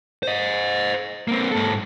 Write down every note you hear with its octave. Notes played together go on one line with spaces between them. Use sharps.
C5 D#5
A#3 C4
G#2 A4